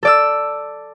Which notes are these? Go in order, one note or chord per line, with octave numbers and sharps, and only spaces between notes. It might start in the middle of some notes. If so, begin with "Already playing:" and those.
A4 D5 E6